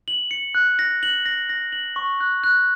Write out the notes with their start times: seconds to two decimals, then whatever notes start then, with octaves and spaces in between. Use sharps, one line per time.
0.08 F#7
0.31 C#7
0.55 F#6
0.79 A#6
1.03 F#7
1.26 A#6
1.49 A#6
1.72 F#7
1.96 C#6
2.20 F#6
2.44 F#6